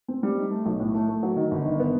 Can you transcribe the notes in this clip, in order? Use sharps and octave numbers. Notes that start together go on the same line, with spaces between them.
C4
G3
D#4
A3
B1
A2
A3
A3
F#3
D#3
G1
D#3
B3